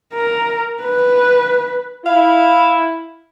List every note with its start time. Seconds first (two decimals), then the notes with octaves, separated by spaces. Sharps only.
0.14 A#4
0.82 B4
2.06 E4 F5